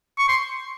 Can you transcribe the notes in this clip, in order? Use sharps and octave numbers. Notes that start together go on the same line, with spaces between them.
C#6
C6